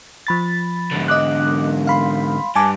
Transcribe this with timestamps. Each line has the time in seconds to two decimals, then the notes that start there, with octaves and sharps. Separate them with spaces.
0.27 F3 B5 A6
0.91 G#2 D3
1.08 D#5 D6 F#6
1.87 F5 B5 C6
2.56 G2 G#5 A5 D6